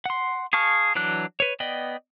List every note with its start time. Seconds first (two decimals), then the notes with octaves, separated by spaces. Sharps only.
0.06 F#5 C6
0.53 G#4 F5 A5 C#6 F6
0.95 E3 F#3 D4 F#6
1.40 B4 C#5
1.60 B3 D5 D#5 G5